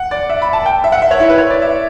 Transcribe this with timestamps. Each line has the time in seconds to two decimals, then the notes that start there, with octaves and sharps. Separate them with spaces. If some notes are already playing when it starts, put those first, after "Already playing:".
Already playing: F#5
0.11 D5
0.30 E5
0.42 B5
0.53 A5
0.66 G5
0.84 E5
0.92 F#5
1.02 E5
1.11 C#5
1.20 E4
1.30 B4
1.38 C#5
1.50 D5
1.62 E5